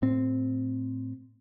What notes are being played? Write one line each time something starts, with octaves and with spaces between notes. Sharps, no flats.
A2 C4